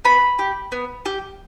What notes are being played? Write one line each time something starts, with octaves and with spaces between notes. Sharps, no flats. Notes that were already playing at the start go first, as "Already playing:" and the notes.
B3 B5
G4
B3
G4